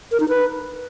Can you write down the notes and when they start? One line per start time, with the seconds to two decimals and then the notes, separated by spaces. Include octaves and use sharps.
0.11 A#4
0.20 D#4
0.29 B4